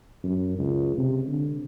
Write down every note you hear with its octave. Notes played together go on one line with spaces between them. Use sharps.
F#2
C#2
C3
D3